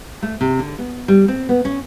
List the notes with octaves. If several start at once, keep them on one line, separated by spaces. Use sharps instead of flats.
A3
C3
D3
B3
G3
C4
B3
C#4